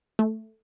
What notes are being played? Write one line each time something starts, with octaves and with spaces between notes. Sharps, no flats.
A3